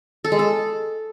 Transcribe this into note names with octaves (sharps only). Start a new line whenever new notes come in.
A4
G#3
A4